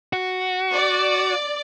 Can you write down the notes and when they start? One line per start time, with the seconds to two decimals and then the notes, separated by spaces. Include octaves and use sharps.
0.13 F#4
0.74 D5